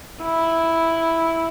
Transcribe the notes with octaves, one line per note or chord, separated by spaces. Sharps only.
E4